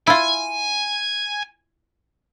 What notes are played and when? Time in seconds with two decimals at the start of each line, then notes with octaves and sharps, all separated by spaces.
0.07 E4 F4 G#5